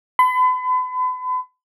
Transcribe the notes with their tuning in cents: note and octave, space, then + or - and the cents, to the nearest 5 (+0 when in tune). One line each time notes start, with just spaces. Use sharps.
B5 +40